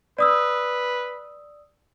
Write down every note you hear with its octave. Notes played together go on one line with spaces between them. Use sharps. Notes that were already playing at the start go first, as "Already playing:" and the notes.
B4 D5 D#6 E6